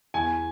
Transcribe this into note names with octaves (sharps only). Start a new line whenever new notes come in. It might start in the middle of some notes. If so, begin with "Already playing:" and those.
E2 G#5